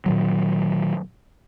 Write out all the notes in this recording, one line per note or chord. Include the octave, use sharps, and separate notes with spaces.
A#2 D#3 F#3